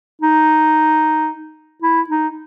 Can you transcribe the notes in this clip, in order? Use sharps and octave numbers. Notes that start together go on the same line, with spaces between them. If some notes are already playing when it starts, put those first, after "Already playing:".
D#4
E4
D#4